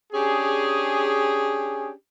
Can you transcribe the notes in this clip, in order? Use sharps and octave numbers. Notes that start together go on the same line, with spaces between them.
C#4 D4 G4 G#4